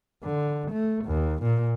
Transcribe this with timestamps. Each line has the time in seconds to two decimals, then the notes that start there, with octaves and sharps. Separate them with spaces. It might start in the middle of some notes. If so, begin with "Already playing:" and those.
0.23 D3
0.71 A3
1.05 D#2
1.42 A#2